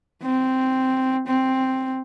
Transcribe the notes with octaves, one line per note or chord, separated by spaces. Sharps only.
C4
C4